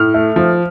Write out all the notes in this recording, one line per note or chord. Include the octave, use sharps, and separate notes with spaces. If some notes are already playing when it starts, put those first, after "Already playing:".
Already playing: A2 F6
A3
F3